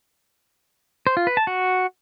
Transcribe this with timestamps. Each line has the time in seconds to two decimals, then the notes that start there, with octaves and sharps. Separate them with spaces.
1.07 C5
1.17 F4
1.27 B4
1.37 A5
1.47 F#4